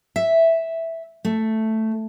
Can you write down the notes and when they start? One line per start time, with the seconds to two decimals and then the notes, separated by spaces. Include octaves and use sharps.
0.16 E5
1.25 A3